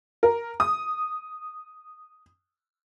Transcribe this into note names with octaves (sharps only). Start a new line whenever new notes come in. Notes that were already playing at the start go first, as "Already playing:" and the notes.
A#4
D#6